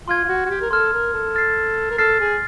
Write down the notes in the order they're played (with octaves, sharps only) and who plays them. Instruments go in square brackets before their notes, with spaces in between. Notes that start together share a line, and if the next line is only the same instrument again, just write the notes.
[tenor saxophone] F4 [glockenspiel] C6 F6 G#6
[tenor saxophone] F4
F#4
F#4
G4
A#4
[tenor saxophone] A4 [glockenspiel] C6 F6 G#6
[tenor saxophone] A#4
A4
[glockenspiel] F6 A6 C7
[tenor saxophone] A#4
[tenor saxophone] A4 [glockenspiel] F6 A6 C7
[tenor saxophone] G#4